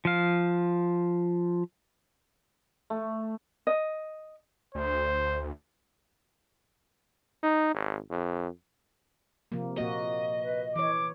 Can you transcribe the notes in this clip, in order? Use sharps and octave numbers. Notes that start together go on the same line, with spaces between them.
F3 F5
A3
D#5
D2 C5
D#4
G#1
F2
C3 F3 A#3
A#2 A#3 F#4 D#5
B4
E3 C#5 D6